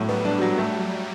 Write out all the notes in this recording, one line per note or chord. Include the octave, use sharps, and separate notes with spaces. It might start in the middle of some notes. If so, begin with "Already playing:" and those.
Already playing: A2 F#3
G3 B3
D4
F#3
A3